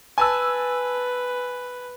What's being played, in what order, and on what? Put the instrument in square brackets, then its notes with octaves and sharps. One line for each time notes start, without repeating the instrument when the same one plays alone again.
[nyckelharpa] B4 [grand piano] G#5 A5 E6